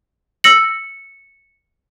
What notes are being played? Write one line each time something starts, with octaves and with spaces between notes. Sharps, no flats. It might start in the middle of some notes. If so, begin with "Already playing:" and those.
E6 A#6 C#7 F#7